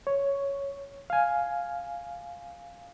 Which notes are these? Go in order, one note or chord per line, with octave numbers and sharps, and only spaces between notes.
C#5
F5 G#5